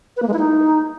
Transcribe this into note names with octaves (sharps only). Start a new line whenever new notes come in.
B4
A#3
G#3
E4
D#4